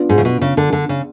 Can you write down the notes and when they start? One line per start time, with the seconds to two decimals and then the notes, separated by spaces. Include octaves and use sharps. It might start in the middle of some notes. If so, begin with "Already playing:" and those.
Already playing: B3 D4 F4
0.09 G#2
0.18 C#3
0.25 B2
0.41 C#3
0.57 D3
0.73 D3
0.89 C#3